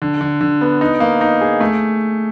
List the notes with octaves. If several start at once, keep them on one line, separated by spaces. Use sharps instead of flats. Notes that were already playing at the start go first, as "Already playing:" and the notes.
D3
D3
D3
B3
D#4
A#3
D#4
G#4
A3